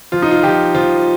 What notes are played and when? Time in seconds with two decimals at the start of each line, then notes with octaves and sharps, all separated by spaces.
0.12 F3 F4
0.22 D#4
0.31 F4
0.43 F3 G4
0.75 F3 F4